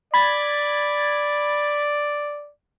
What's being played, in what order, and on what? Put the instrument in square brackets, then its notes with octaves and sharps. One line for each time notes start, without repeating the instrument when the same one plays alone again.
[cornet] D5 [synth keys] B5 G#6 A6